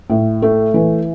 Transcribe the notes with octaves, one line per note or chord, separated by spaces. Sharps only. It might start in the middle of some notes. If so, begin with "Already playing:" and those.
A2
A3
E3